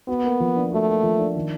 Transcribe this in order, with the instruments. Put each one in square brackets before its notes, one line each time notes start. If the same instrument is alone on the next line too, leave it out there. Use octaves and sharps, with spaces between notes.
[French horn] B3 [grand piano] F#4
[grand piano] A#3
F3
D4
[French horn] A3 [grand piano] F#4
[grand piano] A#3
F3
D4
D#3